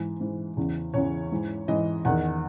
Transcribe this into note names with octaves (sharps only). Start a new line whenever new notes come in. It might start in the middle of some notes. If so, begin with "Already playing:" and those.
Already playing: G#2 E3
G#2 E3
E2 C#3 E3
E2 C#3 E3 C#5
G#2 E3
G#2 E3 D#5
E2 D#3 F#5